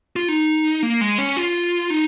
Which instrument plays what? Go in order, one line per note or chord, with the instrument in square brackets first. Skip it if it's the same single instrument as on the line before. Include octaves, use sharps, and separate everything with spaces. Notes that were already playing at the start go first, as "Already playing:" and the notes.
[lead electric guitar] F4
D#4
A#3
G#3
C#4
F4
D#4